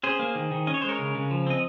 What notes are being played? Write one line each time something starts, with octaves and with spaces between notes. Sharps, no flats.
C#4 G#4 C5
A#3
D#3
D#3
C#4 D#5
C#5
G#3 C5
A#4 C#5
C#3
C#3
F3
C4 D#5